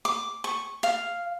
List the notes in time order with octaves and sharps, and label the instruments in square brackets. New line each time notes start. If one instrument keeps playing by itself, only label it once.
[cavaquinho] D6
C#6
F5